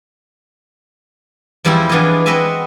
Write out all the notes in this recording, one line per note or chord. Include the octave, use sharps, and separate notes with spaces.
E2 F3 G3 C4 E4 G5
E3 B3 D4 F4 G#4 D#5
C4 F#4 B4 D#5 E5 G#5